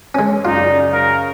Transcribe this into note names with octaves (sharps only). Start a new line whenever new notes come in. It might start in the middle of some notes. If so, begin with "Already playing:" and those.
G#3 C#4
F#2 C#3 D#4 F4 D5
A#4 F5